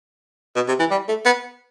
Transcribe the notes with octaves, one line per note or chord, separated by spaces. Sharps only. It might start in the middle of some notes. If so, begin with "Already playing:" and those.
B2
C3
E3
G3
A3
B3